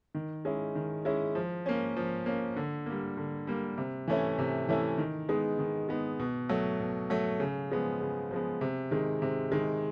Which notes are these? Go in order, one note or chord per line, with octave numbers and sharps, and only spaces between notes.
D#3
G#3 C#4 E4
D#3
G#3 C#4 E4
F3
A#3 C#4
F3
A#3 C#4
D3
G3 A#3
D3
G3 A#3
C3
E3 A3 C#4 E4
C3
E3 A3 C#4 E4
D#3
G#3 B3 D#4
D#3
G#3 B3 D#4
B2
F#3 A3
B2
F#3 A3
C#3
F3 G#3 B3
C#3
F3 G#3 B3
C3
D#3 G#3
C3
D#3 G#3